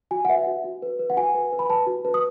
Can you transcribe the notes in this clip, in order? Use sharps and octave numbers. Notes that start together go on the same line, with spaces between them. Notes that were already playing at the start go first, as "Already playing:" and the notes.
F#4 G#5
F#5
B4 E5
F#4
F#4
B4
B4
F#5
F#4 G#5
B4
B4
B5
B4 A5
F#4
B4
D#6